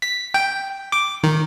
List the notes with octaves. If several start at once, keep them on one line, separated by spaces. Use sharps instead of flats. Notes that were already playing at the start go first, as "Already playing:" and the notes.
B6
G5
D6
D#3